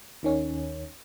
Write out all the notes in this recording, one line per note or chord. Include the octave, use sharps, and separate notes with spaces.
D#2 D#3 C#4